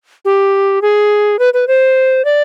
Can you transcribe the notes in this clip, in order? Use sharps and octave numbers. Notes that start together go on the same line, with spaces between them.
G4
G#4
B4
B4
C5
D5